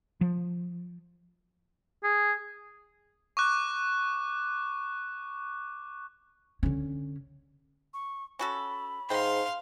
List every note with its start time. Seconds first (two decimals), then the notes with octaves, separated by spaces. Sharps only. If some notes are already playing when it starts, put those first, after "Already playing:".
0.21 F3
2.04 G#4
3.37 C#6 D6 F#6
6.63 D3 C#4
7.94 C#6
8.39 C#4 F#4 A4 B5
9.10 G#2 G#3 F5 G5 C6